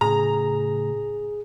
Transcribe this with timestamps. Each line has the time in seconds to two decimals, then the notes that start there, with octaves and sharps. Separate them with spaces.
0.01 A2 C#3 G#4 A#5